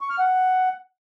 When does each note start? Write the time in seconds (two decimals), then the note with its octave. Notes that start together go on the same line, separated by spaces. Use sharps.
0.01 C#6
0.10 F6
0.19 F#5